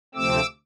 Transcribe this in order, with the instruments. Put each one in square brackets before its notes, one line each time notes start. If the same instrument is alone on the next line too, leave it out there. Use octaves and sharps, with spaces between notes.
[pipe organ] D2 C3 F3 A3 C4 D6 E6